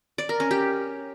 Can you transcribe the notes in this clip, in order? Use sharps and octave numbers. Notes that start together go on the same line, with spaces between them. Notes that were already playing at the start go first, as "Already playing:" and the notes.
D5
A#4
C#4
G4